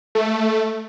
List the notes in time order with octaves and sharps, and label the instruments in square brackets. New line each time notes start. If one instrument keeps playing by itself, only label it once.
[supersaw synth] A3